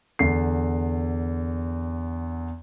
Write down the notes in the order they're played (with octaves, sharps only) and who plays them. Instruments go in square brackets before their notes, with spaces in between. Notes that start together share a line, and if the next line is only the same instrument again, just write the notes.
[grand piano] E2 D3 C7